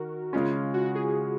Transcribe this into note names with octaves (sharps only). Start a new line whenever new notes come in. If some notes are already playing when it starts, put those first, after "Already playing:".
Already playing: D#3 F#4 A#4
C#3 G#3 C#4 F4
F#4
F#4
G#4